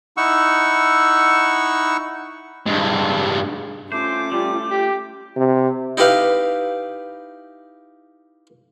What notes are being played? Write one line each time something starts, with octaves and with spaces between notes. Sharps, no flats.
D#4 E4 F#5 C#6 E6
G2 G#3
A3 C#4 F4 C5 D6
G3 A3
G4
C3
D#4 E4 G4 B4 F5